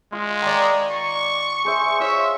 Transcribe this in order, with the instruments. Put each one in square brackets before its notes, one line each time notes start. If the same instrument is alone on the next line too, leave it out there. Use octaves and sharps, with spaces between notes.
[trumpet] G#3 [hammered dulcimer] F4
[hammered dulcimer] D#3 D5
[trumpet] C#6
[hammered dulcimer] G#4 C5 E5
[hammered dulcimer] F4 C#5 [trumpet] E5